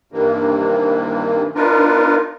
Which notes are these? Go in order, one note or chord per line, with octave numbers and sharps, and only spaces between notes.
G2 C3 D#3 E3 A#3
B3 D4 D#4 F4 A#4 B4